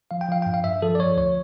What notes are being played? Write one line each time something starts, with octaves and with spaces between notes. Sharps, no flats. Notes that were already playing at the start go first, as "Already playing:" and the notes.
F3 F5
G5
F3 F5
G2 G5
F5
G2 E5
F3 A4
D5
F3 C#5
D2 C#5